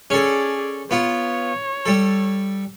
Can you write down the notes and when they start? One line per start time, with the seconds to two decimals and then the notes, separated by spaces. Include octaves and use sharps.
0.10 C#4 G#4 A4 D5
0.91 B3 F4 C#5
1.86 G3 A4